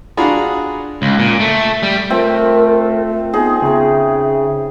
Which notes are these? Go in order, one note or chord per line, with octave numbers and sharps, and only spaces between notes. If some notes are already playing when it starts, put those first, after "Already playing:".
D4 F4 F#4 G#4 A#5 B5
C#2
A#2
A3
G3
A3 C4 F4 A#4
B3 D#4 G#4
C#3 E5